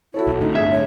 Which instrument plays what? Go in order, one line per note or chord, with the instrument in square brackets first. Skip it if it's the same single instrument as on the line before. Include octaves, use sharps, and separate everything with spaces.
[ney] E4 [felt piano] F#4 A4 C#5
[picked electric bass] B1
[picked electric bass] A2 D3 [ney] D#4
[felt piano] G1 G#6 [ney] G#4 [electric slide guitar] E5
[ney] C#5